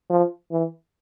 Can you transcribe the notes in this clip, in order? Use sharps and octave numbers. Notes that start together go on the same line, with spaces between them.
F3
E3